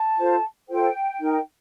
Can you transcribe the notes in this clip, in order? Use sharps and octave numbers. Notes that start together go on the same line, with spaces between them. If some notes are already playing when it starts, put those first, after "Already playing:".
Already playing: A5
F4 A4 C5
F4 A4 C5 G5
D#4 A#4